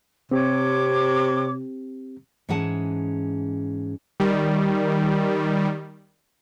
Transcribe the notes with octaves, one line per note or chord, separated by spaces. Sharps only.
C3 C4 G4 C#5 D6
G#2 E3 C#4 G#4 F#5 A5
D#3 G3